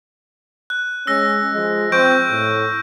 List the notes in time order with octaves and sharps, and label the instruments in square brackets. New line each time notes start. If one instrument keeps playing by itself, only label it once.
[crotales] F#6
[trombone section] G#3 C#4 [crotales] E6 A#6
[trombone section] F3 G#3
[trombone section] F3 C4 [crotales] C#6 G6 D7
[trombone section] A2